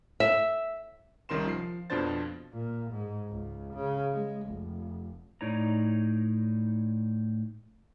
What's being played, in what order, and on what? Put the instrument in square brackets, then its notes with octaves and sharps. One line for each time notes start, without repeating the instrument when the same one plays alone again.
[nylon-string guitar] E5
[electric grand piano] C2 D#3 C#4 A#4 C6 E7
F3 C7
F2 B2 F3 D4 C5 A6
[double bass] A#2
G#2
C#2
C#3
G#3
F1
[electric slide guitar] A2 D#4 C#5 D5 A#5